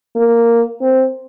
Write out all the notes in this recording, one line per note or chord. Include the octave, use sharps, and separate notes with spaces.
A#3
C4